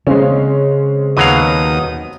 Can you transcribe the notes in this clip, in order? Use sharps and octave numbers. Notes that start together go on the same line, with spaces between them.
C#3 G#3 C4 C#4
D#2 B2 F#3 F5 D#6